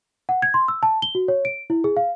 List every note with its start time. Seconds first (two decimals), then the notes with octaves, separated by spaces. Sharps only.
0.29 F#5
0.42 G#6
0.54 C6
0.68 E6
0.83 A5
1.02 G7
1.15 F#4
1.28 C#5
1.45 D7
1.70 E4
1.84 G#4
1.97 F5